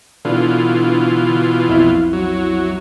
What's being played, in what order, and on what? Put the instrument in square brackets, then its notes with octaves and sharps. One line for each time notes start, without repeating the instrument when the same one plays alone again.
[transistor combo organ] B2 E3 F4 [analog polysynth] D3
[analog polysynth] B1 F2 E4
[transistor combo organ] F#3